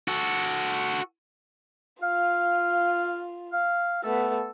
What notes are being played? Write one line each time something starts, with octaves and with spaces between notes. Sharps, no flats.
F#4 A4
F4 F5
F5
A3 B3 A4